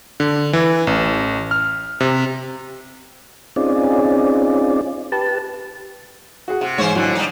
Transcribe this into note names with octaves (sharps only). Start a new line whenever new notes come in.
D3
E3
A1
F6
C3
C4 C#4 D#4 F4 G#4 D5
G4 B4 A5
F#4 G#4 F#5
C3 F#5
G#2 E3 C5 C#5
F2 D3 E3 F#3
G3 D#4